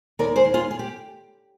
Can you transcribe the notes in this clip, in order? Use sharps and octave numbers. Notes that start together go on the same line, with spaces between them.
D#2 A#4 D5
G#4 C5
D#2
F4 G#4
G#4
G4